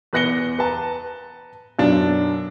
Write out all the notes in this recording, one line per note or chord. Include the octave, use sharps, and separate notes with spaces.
E2 B4 F#6 A#6 C#7 G7
B4 A5 A#5
F#2 B2 D4